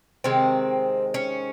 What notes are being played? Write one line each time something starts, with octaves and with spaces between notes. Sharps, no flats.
C3 D#3 G#3 C4
C#4